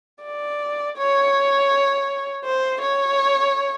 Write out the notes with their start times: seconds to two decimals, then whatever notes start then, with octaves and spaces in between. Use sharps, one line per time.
0.24 D5
0.97 C#5
2.45 C5
2.81 C#5